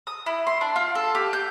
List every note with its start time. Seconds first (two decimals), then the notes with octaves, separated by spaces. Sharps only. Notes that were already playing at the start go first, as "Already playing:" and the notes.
0.07 D#6
0.26 E4
0.47 C6
0.61 D4
0.76 F4
0.95 A4
1.15 G4
1.33 G6